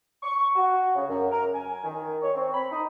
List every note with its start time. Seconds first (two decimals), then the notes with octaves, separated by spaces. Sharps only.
0.22 C#6
0.56 F#4
0.95 C#3
1.09 F#2
1.31 A#4
1.54 G#5
1.84 D#3
2.22 C#5
2.35 C4
2.53 B5
2.71 D#4